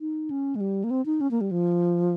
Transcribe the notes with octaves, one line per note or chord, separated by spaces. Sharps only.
D#4
C#4
G#3
G3
A#3
C4
D#4
C#4
A#3
G3
F3